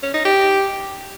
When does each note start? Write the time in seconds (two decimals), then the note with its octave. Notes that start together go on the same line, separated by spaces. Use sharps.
0.03 C#4
0.14 D#4
0.25 G4